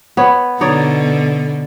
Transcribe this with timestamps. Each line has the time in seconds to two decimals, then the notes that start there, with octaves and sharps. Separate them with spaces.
0.17 B3 C#5
0.61 B2 D3 D#4 C#5 D5